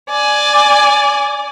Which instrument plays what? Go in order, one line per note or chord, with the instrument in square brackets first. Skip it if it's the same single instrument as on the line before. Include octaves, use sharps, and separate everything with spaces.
[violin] D5 G#5